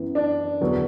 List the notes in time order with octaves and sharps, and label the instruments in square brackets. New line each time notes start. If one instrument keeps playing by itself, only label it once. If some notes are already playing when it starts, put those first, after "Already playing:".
Already playing: [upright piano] F#2 E3 B3
[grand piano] D4
[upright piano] E2 D3 F#3 B3